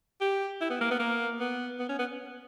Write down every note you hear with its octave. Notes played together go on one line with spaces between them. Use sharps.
G4
E4
B3
A#3
B3
A#3
B3
B3
C#4
B3